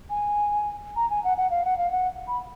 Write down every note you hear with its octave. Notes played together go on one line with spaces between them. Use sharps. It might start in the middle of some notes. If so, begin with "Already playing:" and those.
G#5
A#5
G#5
F#5
F#5
F5
F#5
F5
F#5
B5